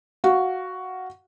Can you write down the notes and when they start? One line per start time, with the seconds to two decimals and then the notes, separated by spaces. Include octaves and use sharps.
0.24 F#4 F5